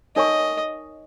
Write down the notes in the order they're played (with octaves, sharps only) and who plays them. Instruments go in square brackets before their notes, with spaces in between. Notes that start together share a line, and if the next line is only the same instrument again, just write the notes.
[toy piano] D#4 A#4 C#5 G#5 C#6 [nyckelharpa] D#5